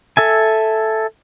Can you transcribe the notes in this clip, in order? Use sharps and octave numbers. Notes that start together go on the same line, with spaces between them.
A4 E5 G#5